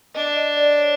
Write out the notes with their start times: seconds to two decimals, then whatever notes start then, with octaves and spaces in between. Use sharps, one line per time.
0.15 D4 D#5
0.36 D#5
0.57 D5
0.78 C#5